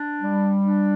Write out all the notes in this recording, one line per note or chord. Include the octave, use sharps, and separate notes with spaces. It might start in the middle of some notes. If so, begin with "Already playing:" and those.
Already playing: D4
G3
D4